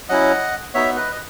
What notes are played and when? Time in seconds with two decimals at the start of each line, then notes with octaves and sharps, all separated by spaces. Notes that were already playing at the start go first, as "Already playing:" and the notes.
0.09 F#3 C#4 E4 D#5 F#5
0.74 B3 D#4 F#4 C#5 E5
0.96 B4 D#5
1.12 D#5